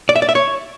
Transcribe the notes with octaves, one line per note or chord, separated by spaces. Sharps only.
D5
E5
D5
E5
C#5